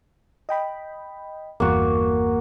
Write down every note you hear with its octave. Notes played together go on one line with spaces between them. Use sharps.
D#5 G5 B5
G1 E2 G2 A#3 F#4